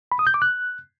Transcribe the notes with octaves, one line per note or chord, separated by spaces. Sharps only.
B5
D#6
G6
D6
F#6